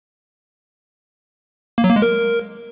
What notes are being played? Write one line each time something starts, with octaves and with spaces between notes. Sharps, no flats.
A#3
F#3
A#3
G#3
A#4